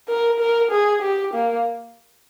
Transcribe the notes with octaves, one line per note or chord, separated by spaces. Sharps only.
A#4
A#4
G#4
G4
A#3